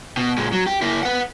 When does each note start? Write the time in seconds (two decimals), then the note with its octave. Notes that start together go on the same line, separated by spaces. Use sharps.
0.17 B2
0.37 A#2 G#3
0.52 F#3
0.66 G4
0.82 A#3 E4
1.03 B4 F#5